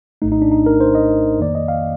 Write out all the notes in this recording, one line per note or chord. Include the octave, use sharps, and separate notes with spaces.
A#1 A2 A3 D#4
D#4
D4
D#4
A#4
C5
D#5
F2 D#3 A#3 D5
D#5
F5